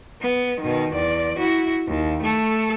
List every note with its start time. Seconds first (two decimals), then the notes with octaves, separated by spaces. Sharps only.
0.21 B3
0.61 B2 D#3
0.94 E2 D5
1.39 E4 F#4
1.88 D#2
2.23 A3 A4